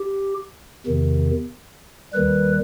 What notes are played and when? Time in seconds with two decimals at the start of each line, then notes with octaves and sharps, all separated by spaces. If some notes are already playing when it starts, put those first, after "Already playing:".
Already playing: G4
0.86 E2 C3 D#3
2.13 D#2 D#3 G3 B4